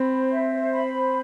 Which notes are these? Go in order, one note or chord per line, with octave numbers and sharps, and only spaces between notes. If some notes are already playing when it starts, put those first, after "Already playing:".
Already playing: C4 B5
C5
E5
C5
B5
C5